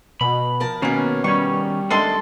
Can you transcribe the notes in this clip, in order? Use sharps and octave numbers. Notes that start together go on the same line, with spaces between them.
B2 B5
F3 A#4 A5
B2 D#3 A#3 B3 C#4
D#3 G3 C#4 C#6
D#3 G#3 A3 D4 A4 C6